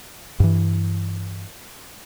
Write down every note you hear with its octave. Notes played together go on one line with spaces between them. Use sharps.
G2 E3